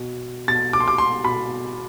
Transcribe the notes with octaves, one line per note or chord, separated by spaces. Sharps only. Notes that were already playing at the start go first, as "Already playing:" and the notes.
Already playing: B2
B2 A6
D6
C6
D6
C6
B2 B5